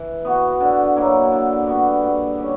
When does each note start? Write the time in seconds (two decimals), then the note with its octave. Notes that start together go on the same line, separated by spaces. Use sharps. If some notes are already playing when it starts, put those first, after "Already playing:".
Already playing: E3
0.25 B3 F#4
0.60 D3
0.96 F#3 A#3 E4
1.31 D3
1.67 G3 B3 F#4
2.03 A#2
2.39 G3 C#4